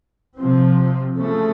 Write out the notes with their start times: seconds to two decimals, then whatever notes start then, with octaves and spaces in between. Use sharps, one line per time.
0.37 C3 F3 C4
1.17 C#3 F3 A3